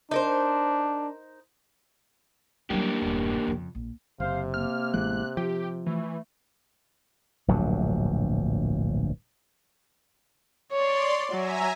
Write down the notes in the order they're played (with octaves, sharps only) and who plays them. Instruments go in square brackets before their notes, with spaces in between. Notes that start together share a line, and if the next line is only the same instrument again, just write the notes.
[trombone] D4 [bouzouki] D#4 A#4 C5
[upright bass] F#3 G3 [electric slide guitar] A#3 D4 G4
[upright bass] E1 G2
F2 C#3
A#1
[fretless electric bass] F#1 [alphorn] C3 [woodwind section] C5 F5
[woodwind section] A#3 [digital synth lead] F6
[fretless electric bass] A1 E3 G#3 [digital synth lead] F#6
[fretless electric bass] F3 [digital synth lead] G4
[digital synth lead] E3 [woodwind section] A3
[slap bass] D1 A#1 G2 F#3
[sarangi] C#5 [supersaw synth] D5 C6
[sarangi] F#3 [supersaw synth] E5 G#5 A#5